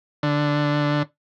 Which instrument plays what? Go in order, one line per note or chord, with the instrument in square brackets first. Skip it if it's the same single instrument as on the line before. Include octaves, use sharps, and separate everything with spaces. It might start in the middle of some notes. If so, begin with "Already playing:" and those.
[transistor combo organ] D3